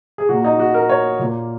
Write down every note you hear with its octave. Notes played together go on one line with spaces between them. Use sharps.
G#4
A#2 A#3 F#4
D#4
F#4
A#4
C#5
A#2 A#3